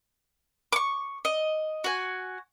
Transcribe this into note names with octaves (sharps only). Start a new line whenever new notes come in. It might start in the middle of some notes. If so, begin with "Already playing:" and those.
C#6 D6
D#5
F#4 G#5